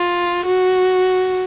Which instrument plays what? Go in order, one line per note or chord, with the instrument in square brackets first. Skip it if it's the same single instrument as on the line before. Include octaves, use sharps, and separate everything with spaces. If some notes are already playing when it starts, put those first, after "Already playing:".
Already playing: [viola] F4
F#4